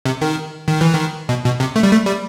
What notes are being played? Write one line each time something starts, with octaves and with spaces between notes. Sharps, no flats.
C3
D#3
D#3
E3
D#3
B2
B2
C3
A3
G3
A3
G3